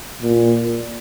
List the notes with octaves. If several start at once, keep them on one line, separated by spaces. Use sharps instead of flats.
A#2